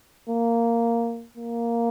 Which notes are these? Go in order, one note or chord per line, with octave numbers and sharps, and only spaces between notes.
A#3
A#3